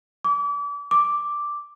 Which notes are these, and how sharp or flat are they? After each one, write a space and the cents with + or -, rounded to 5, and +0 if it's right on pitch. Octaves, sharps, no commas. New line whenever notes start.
D6 -35
D6 +0